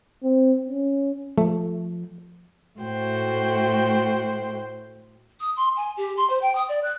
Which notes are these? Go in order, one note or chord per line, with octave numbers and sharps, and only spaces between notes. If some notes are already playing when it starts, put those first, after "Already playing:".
C4
C#4
F3 A3
A2 A3 F#4 C5 G5
D#6
C6
G#5
G4
C6
C5
G5
D#6
D5
F#6